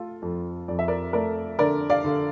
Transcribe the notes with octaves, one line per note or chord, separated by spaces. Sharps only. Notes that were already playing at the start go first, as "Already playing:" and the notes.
Already playing: A3 F4 A4
F2
F2 D5
E5
A#4 D5
A3 A#4 D5
D3 A#4 D5
D5 F5
D3